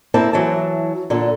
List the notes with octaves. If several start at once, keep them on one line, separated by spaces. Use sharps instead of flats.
A#3 C4 E4 A5
E3 F#3 E4 A5
A#2 D3 A4